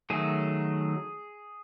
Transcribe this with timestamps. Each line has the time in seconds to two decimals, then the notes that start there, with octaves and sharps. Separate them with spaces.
0.10 D#3 F#3 A3 G#4